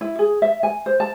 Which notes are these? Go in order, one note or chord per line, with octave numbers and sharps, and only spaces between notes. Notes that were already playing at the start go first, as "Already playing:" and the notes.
E4
G#4
E5
G#5
C5
A5